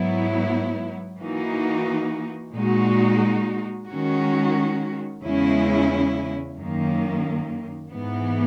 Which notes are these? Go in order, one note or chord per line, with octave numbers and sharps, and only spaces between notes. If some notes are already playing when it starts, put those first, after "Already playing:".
Already playing: G#2 F#3 B3 E4
E3 A#3 D#4 F#4
A#2 G#3 D#4 F#4
D#3 G#3 C#4 F#4
E2 C#3 G#3 C#4 E4
F#2 D#3 A#3
G#2 E3 B3